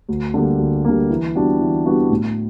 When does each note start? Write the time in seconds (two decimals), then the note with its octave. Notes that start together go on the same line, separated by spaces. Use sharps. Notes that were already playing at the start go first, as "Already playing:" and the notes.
0.09 D2
0.34 D3 G3 A#3
0.59 D2
0.85 D3 G3 A#3
1.10 E3
1.35 G3 B3 D4 F#4
1.61 E3
1.85 G3 B3 D4 F#4
2.10 A2